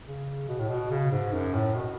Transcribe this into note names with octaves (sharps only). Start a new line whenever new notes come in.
C#3
B2
A2
B2
C#3
G#2
F#2
A2
B2